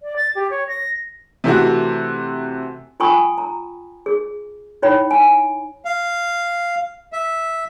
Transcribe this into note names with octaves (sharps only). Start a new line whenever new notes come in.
D5
A6
G4
C#5
A#6
C3 E3 A3 F#4
F4 G5 G#5 B5 C#6 D#6
A#5
G#4
D#4 E4 C#5 G5 B5
G#5
F5
E5